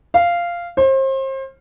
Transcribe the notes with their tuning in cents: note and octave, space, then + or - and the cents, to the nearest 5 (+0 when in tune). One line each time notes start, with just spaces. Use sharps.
F5 -10
C5 +35